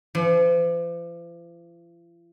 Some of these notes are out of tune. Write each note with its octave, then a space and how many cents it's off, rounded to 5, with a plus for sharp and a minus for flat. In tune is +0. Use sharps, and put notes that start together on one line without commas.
F3 -45